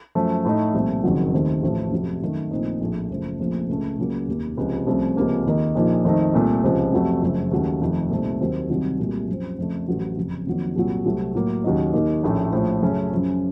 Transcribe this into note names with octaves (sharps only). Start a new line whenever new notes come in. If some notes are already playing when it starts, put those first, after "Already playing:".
F#2 F3 A3
A2 A3 D#4
C2 A#2 F3 A3
F#1 F2 D#3 F#3
D#2 D#3 A3 C4
A1 A2 F3 A3
F2 C3 F#3 A3 C4
F#2 D#3 A3
A#1 A#2 A3 C4 D#4
A#1 A2 A3
F#1 F#2 F3 A3
A#1 A#2 F3 A3 C4
C#2 C#3 A3
C#2 C#3 F#3 A#3
F1 D#2 D#3 A#3
C#2 C3 F3
C2 C3 F3 A3 C#4
C#2 C3 F3 A#3 C#4
D#2 D#3 A#3 D#4
A#1 A#2 F3 A#3 D#4
F2 D#3 A3 C4 D#4
C2 A#2 A3
C#2 C3 F3
F2 C3 F#3 A3
F#1 F#2 F3 A3
D#2 C#3 F#3 A3
F1 F2 D#3 A3
C2 A#2 A3 C4 D#4
D#2 D#3 F#3 C4
C2 C3 D#3 F#3 C4
C2 A#2 F#3 A3
F#2 F3 C4
F2 C#3 A3
A1 A2 F#3 A3
F#1 F2 C#3
F2 D#3 F#3 A#3
C2 A#2 F#3
C2 C3 F#3 A3
A2 F#3 A#3
D#2 C#3 F#3 A#3 D#4
D#2 D#3 A#3 D#4
A#1 A2 A3 C#4
A#1 A2 F3
F#2 C#3 A3 C#4
F#2 C#3 F3